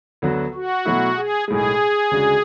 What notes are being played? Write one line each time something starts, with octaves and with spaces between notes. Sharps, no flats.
D2 D3 F#3 B3 F#4
F#4
B2 F#3 A3 E4
G#4
B1 A2 G#3 G#4
D2 C#3 G#3 D4 F#4